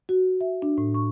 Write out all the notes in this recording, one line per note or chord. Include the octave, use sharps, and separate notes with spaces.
F#4
E5
D4
A2
C#6